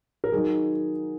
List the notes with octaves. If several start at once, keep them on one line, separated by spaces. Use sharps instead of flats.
A#4
D#3 F#3 D#4 G#4